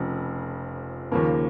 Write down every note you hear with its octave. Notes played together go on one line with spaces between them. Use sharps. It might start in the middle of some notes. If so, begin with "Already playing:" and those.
Already playing: F1 F2 C#3
D#2 C#3 F3 A#3 C#4